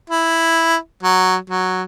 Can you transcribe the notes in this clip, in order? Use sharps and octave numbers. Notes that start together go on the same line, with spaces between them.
E4
F#3
F#3